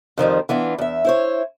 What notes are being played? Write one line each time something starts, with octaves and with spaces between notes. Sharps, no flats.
F2 D#3 F3 G3
E3 B3 D4 F4
E2 E5
E4 C5 C#5